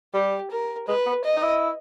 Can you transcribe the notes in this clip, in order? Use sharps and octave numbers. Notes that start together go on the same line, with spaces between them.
G3 G4
A#4
G#3 B4
B3
D#5
D#4
E4